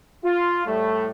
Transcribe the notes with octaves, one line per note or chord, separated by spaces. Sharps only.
F4
A2 G3 A3